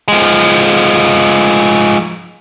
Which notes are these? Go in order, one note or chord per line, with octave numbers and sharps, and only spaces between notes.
F3 G#3